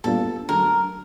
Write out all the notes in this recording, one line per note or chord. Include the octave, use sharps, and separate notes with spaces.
A#2 G3 B3 D4 F4 A4
D3 F#3 A3 A#4